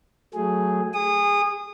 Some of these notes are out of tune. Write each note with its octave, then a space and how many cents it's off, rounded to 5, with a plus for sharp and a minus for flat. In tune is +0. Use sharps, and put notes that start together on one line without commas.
F#3 +0 A3 +0 G#4 +0
G#4 -25 D#6 -20